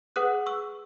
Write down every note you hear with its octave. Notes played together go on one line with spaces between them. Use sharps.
G#4 B4 F#5 D#6 F#6
C#6 E6